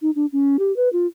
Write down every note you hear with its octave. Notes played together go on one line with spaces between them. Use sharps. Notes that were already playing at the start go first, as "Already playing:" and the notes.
D#4
D4
C#4
G4
B4
F4